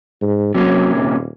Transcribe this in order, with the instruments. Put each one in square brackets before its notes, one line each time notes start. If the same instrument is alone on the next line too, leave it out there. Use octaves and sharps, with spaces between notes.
[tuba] G#2
[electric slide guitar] C3 A#3 C#4 [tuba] F#3
[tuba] D#1